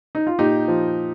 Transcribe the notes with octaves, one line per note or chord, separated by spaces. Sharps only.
D#4
F4
A#2 D#4 G4
F3